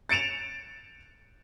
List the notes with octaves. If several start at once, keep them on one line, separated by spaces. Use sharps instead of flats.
A6 C#7 D7 E7 F7